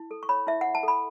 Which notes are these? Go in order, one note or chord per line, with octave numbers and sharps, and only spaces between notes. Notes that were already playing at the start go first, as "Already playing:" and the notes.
Already playing: E4
A4
C#6
C#5 B5
E4 E5
E4 F#5
A5
A4 B5